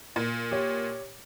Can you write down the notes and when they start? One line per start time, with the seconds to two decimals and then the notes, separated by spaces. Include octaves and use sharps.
0.16 A#2
0.51 G4 C#5